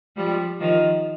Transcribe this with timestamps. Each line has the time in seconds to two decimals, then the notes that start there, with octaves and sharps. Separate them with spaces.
0.16 F3 G3
0.60 D#3 F3